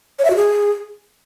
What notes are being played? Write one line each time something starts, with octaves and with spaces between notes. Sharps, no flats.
C#5
E5
F#4
G#4